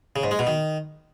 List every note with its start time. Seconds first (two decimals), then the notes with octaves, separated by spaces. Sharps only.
0.16 C#3
0.24 G#2
0.31 G#3
0.39 B2
0.47 D#3